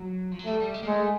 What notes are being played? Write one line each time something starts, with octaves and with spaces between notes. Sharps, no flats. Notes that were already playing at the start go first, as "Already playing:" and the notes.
Already playing: F#3
F3
F#3
G3 A3
G3
G#3
A#3
G#3 A3